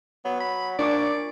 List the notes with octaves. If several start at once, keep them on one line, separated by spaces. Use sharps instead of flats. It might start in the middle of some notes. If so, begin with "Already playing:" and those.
F#3 B3
B5
A#2 D4 D5 C#6 D6